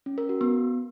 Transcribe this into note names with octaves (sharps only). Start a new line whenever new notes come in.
C#4
A#4
F#4
B3